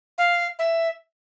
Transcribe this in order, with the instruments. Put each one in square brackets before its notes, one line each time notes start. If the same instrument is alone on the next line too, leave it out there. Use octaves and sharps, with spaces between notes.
[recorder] F5
E5